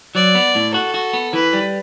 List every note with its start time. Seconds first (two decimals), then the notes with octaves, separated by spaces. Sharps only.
0.15 F#3 D5
0.35 B3
0.55 A2
0.74 F#4 A4
0.94 F#4
1.13 B3
1.33 E3 B4
1.53 G3